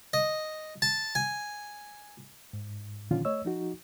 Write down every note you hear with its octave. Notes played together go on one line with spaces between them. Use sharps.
D#5
A5
G#5
G#2
A#2 D3 D#3 F3 C#4 F4
A3 C#5 D#5 E6
F3 D#4 F#4